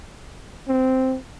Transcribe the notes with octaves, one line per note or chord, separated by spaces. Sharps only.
C4